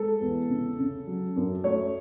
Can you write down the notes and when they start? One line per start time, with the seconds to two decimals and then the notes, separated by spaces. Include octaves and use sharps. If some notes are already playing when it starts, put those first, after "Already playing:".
Already playing: G#3 A4
0.21 E2
0.49 C#3
0.79 C#3
1.07 F#3
1.36 F#2
1.64 A3 C#5